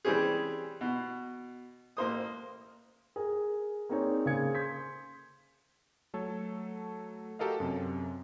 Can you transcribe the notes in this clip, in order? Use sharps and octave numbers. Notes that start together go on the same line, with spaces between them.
E3 G3 C4 C#4 G4 G#4
B2
A1 A#3 C5 D#6
G#4 A#4
A#3 C4 D4 D#4 G#4 C#5
C#3 A#3 G#4 C5 G#6 C#7
C6 G6 G#6 B6
F#3 A3 A4 C#5
F#4 G4 A4 A#4 D#5 F5
F#2 C3